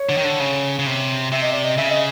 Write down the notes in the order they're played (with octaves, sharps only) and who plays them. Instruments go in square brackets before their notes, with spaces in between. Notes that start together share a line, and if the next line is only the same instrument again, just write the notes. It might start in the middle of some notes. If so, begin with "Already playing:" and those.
Already playing: [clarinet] C#5
[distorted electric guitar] D3
D#3
D3
C#3
C#3
C3
[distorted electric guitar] C3 [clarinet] E5
[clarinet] D#5
D5
D#5
[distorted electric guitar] C#3 [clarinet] E5
[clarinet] D#5